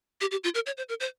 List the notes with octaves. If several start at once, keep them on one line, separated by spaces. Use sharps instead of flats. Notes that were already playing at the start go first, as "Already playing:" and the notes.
G4
G4
F4
A#4
C#5
C5
A#4
C5